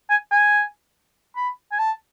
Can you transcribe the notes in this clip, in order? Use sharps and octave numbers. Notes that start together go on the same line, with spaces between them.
G#5
G#5
B5
G#5
A5